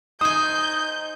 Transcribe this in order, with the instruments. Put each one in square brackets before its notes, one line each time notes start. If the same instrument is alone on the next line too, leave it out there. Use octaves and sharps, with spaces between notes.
[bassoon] D#4 [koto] C5 G#5 [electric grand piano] D#6 [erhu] G6